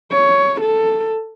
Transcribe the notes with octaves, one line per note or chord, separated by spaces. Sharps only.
C#5
A4